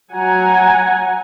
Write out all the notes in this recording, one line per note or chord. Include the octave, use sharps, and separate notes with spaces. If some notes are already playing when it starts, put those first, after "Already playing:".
F#3 F#5 G#5 A#5